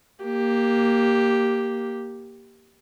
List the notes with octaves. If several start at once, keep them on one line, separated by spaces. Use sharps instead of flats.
A#3 G4